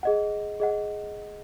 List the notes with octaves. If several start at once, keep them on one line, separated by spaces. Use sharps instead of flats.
G#4 D#5 F#5
G#4 D#5 F#5